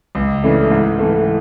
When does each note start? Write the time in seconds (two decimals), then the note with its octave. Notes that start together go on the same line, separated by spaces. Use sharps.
0.15 C#2
0.43 C#3 E3 A3 D4
0.71 G#2
0.99 E3 A3